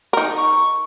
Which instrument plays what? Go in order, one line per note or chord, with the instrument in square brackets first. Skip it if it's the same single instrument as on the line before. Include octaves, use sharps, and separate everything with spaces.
[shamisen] D#4 A#4
[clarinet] C#6